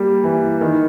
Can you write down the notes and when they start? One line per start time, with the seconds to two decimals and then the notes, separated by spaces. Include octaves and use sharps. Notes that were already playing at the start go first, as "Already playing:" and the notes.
Already playing: G3 A#3
0.24 E3
0.61 D#3